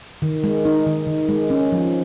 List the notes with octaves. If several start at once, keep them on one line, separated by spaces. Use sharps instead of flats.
D#3
G#3
D#4
D#3
D#3
G#3
C#4
F3